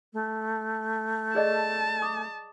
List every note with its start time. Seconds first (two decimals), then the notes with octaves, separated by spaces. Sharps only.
0.13 A3
1.35 G#4 D5 D#5 A5
2.02 D6 D#6